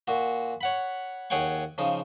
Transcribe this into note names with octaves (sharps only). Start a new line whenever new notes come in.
A#2 F#4
C#5 F#5 B5
D#2 G#4 C#5 F#5 G5 C#6
C#3 F3 D#4